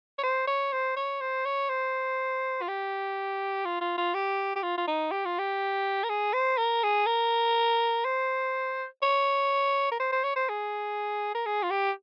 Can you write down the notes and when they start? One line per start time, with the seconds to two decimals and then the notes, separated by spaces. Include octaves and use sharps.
0.18 C#5
0.24 C5
0.47 C#5
0.72 C5
0.97 C#5
1.21 C5
1.45 C#5
1.69 C5
2.62 F4
2.68 G4
3.65 F4
3.81 F4
3.98 F4
4.14 G4
4.56 G4
4.63 F4
4.78 F4
4.88 D#4
5.12 G4
5.26 F4
5.39 G4
6.04 A#4
6.09 G#4
6.34 C5
6.58 A#4
6.83 G#4
7.06 A#4
8.05 C5
9.02 C#5
9.91 A#4
10.00 C5
10.12 C5
10.24 C#5
10.36 C5
10.49 G#4
11.35 A#4
11.46 G#4
11.63 F4
11.71 G4